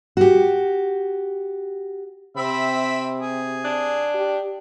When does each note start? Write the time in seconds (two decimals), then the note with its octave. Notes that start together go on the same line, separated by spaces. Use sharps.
0.17 F#4 G4
2.37 C3 C4 E5 B5
3.20 G#4
3.65 D4
4.14 G4